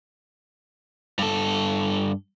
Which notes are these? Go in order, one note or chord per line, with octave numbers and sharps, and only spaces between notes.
G2 A4